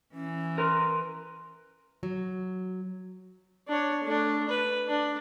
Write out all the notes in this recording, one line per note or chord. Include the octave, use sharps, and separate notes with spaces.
E3 C#4
A#4 B4 C6
F#3
D4 C#5
A3 D4
B4
D4